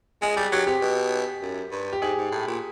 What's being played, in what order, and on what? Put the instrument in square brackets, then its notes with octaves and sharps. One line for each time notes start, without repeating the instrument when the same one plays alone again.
[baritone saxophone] G#3 [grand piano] G#4
[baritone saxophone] G3 [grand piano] G4
[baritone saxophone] F#3 [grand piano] G4
[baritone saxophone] C3 [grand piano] G4
[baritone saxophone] B2
F#2
G2
[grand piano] G4
[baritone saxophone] G#2 [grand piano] G#4
[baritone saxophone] G#2
A2
A#2